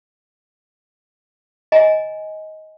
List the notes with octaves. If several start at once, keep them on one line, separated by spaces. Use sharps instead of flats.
D#5 G#5 A#5